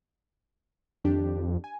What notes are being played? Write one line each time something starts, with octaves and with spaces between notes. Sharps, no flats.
F2 D#3 D4 G4
G#5